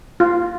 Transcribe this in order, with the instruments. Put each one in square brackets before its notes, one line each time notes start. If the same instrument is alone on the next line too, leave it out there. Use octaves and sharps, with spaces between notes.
[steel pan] F4